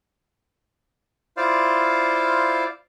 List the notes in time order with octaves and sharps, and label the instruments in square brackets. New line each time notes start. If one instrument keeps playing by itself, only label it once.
[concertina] E4 F4 C5 D5 F5